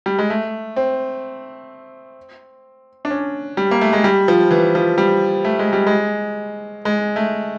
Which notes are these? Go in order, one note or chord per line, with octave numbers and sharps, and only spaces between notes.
G3
G#3
A3
C4
D4
C#4
G3
A#3
A3
G#3
G3
F3
E3
F3
G3
A3
G#3
G3
G#3
G#3
A3